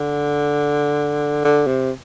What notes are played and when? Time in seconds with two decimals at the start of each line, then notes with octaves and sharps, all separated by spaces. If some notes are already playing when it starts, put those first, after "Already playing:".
Already playing: D3
1.44 D3
1.67 C3